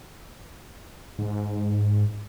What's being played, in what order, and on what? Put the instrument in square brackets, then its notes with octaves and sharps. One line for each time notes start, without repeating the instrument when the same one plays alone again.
[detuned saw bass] G#2